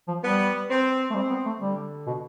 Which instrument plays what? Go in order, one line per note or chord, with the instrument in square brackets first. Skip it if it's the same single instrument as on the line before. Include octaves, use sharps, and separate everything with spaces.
[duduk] F3
[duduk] G3 [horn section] B3
[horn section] C4
[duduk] A3
[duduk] G3 [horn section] C4
[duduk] B3
A3
[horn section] D3 [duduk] G3
[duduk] B2